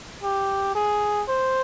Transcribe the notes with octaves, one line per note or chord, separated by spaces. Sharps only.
G4
G#4
C5